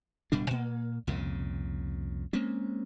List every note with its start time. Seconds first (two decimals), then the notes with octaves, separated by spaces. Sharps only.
0.32 D1 B2 G3 D4
0.51 A#2 A#3
1.07 C2 F2 A#2 C#3
2.33 G#3 A#3 C4 C#4